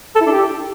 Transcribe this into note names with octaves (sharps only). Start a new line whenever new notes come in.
A4
E4
D4
G4